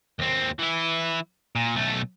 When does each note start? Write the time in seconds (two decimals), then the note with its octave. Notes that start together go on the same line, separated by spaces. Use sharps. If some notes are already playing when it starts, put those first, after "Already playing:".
0.19 D#2 C4
0.59 E3 E4
1.56 A#2
1.75 B1 A3